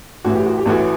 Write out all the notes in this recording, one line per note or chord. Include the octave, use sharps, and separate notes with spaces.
A1 A2 E3 F#4
G4
F#4
G4
A1 A2 E3 F#4